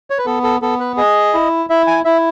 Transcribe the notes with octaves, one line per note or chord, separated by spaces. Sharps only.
C#5
B4
B3 A4
A4
B3 A4
B4
G#4 D#5
E4
E4 E5
G#5
E4 E5